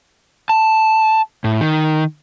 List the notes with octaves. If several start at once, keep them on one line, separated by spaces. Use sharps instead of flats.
A5
A2
D#3